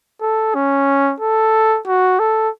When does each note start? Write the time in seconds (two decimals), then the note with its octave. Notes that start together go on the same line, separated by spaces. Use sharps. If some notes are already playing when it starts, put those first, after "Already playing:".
0.22 A4
0.55 C#4
1.20 A4
1.87 F#4
2.20 A4